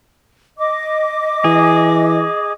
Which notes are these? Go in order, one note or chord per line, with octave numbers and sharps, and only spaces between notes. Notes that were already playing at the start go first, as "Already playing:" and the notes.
D#5 D6
E3 G#4